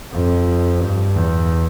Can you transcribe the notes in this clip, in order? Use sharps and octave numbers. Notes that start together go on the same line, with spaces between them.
F2
G2
E2